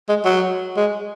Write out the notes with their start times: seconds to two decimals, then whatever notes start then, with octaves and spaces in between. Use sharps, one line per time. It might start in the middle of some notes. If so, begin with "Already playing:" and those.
0.09 G#3
0.25 F#3
0.77 G#3